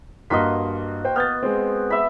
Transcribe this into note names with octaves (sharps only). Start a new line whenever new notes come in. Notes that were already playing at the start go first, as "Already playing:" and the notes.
G2 A#3 F#4 D#5 C6 B6
C5 G5
B3 F6 G6 A6
G#3 C4
E5 B5